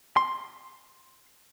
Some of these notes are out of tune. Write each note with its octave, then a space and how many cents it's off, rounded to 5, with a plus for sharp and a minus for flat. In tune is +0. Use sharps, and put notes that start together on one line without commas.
C6 +5